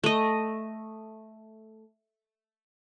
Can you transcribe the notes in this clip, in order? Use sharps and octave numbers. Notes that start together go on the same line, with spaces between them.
A3 D#5